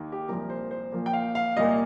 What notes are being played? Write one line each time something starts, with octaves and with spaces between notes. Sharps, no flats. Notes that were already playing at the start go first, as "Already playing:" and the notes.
Already playing: D#2 D#3 A#3
G4
C2 A#2 F3 A#4
C5
C5
A#2 F3 A#3
G5
F5
F5
C2 A#2 A#3 D#5